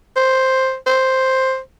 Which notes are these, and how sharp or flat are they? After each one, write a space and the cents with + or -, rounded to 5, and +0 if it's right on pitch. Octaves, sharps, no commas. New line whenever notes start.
C5 +5
C5 +5